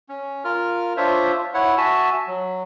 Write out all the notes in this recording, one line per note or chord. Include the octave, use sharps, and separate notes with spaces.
C#4
F4 A#4 F6
D4 F4 C5 C#5 E5
E4 C#5 F#5
F#4 E5 G#5 A5
F#3